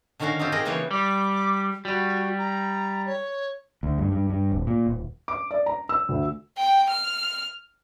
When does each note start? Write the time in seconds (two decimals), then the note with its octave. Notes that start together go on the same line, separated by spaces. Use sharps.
0.20 D3 D#3 C#4 F#4 A#4 F5
0.39 C4 D#4 F4 G4
0.52 G4 G#4 A#4 D#5 G5
0.65 C#3 E3 A#3 B4 C#5 G5
0.91 G3 D6
1.85 G3 F#4
2.38 A#5
3.06 C#5
3.83 D2
3.98 G2
4.12 G2
4.30 G2
4.52 D1
4.67 A#2
4.86 D#1
5.28 D6
5.51 D5
5.66 A#5
5.89 E6
6.09 D2
6.58 G5
6.89 F6